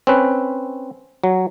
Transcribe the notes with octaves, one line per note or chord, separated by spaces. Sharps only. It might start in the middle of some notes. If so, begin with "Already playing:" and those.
C4 C#4 B4
F#3